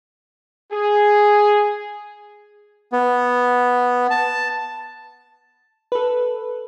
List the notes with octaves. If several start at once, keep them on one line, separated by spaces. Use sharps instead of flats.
G#4
B3
A5
A4 B4